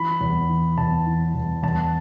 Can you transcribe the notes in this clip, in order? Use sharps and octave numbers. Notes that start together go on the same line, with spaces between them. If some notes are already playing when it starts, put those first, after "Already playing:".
Already playing: E3 B5
E2
E3
E2 A5
E3
E2
E2 A5